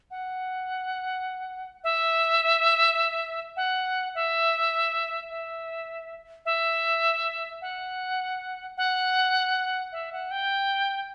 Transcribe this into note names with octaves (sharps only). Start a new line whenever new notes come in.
F#5
E5
F#5
E5
E5
E5
F#5
F#5
E5
F#5
G5